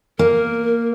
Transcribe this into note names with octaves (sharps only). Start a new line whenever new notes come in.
A#3 A#4